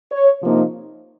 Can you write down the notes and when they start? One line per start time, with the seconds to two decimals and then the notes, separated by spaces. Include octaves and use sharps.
0.12 C#5
0.43 C3 F3 A#3 D#4